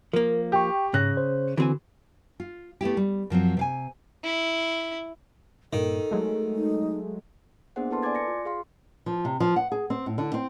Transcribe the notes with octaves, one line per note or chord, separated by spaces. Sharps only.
F3 A#3 A#4
G4 G5 C#6
G#2 C#3 F#6 A#6
C5
D3 E3 C4 F#4 G#5
F4
A3 B3 E4 G4
G3
F#2 F3 F#3 C4
C3 F5 G#5
E4
G2 A#2 D#3 A4
F#3 G#3 A3
D#4
A#3 B3 D4 G#4 C5 F#5
E4 A4 B4 A5 C6
D5 G#5 C6 D6 G#6 A6
A#6 C#7
F4
G#4 F5 C6
F3
C3
F3
F#5
G#4
C4
A2
D3
C4